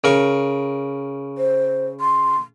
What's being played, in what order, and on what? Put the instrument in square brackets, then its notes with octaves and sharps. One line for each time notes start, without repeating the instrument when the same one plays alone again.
[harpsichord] C#3 A#4 C#6
[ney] C5
C6